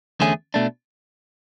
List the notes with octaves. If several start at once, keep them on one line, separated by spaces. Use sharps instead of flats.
E2 D3 A3 C#4 G#4
B2 A3 D4